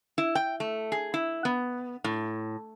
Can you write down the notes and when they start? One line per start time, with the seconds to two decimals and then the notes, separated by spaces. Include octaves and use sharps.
0.18 E4
0.35 G5
0.60 A3
0.92 G#4
1.14 E4
1.45 B3
2.04 A2